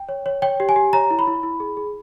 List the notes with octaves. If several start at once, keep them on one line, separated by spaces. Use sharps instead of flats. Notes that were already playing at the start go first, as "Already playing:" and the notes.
Already playing: G5
C#5
C#5
C#5 G5
G4
G#5
G4
C#5 A#5
E4
B5
E4
E4
G#4
G#4